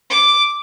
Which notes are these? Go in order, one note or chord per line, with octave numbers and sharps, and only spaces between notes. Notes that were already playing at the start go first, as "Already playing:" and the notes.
D6